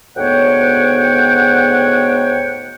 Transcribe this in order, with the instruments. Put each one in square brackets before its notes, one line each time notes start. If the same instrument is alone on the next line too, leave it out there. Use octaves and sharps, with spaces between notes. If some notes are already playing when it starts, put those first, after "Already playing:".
[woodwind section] D2 G#2 B3 C#5 F#5 G5